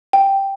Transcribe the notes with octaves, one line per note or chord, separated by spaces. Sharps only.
G5